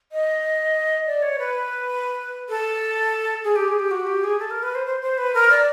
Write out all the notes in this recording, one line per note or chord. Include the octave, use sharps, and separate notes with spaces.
D#5
D5
C#5
B4
A4
G#4
G4
G#4
G4
F#4
G4
G#4
A4
A#4
B4
C5
C5
C5
B4
A#4
D5